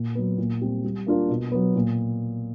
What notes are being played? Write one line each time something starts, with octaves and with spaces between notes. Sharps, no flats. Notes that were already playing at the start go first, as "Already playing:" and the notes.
Already playing: A#2
F#3 B3
A#2
G3 C4
G3
A#3 D4 F4 A#4
B2
F#3 B3
A#2